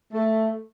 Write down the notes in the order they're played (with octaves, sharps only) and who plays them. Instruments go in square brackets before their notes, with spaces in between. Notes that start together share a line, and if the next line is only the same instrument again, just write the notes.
[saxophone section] A3